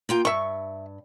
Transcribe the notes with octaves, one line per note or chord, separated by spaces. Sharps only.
A#3 F4 G5
G2 E5 C#6